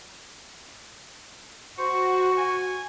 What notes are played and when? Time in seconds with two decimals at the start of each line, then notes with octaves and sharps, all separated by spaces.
1.78 F#4 C5 C#6
2.37 G#5